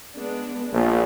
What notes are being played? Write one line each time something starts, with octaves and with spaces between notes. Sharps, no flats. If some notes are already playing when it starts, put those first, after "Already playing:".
G#3 B3 D4
A#1 A#3 F4